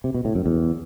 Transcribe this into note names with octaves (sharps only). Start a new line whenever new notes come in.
C3
B2
A2
F#2
E2